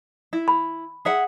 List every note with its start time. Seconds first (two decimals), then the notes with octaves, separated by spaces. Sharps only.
0.33 E4
0.48 B5
1.05 G#4 E5 F#5